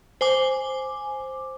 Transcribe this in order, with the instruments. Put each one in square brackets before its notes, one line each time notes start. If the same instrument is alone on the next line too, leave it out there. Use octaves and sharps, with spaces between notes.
[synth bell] C5 G#5 D6